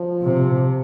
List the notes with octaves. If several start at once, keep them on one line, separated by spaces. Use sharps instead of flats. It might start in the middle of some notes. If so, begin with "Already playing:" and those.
Already playing: F3
C3